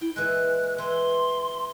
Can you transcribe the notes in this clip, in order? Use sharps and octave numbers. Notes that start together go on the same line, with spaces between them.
E4 G5
A#2 E3 G#3 F#6
E3 C6